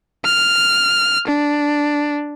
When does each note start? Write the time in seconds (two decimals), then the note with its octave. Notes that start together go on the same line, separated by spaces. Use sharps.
0.25 F6
1.27 D4